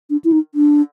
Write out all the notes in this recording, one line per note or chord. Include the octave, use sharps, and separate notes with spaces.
D4
E4
D#4
D4